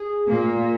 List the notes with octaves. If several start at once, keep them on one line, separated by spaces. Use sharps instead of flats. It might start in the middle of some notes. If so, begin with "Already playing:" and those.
Already playing: G#4
A#2 A#3